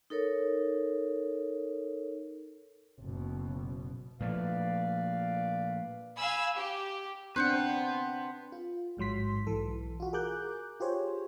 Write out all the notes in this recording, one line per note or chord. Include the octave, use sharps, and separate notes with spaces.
D#4 A4 A#4 C#5
F#1 B2
A#2 F3 A3 B4 D5 F5
F5 G#5 B5 E6
G4
C4 D4 B4 C5 F#5 F#6 G6 C#7
F4
A1 G#2 F#3 C6 B6
B1 E3 A4
F4 F#4
G#4 A#4 D6 F#6 G6
F4 G4 G#4 C5 C#5